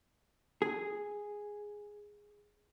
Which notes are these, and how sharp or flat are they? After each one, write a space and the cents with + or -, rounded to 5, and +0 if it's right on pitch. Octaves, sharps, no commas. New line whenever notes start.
G#4 -5